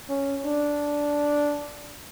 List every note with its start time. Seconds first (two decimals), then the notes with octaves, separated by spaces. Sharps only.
0.09 C#4
0.45 D4